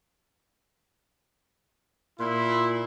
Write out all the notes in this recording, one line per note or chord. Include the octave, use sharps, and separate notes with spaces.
A#2 E4 C6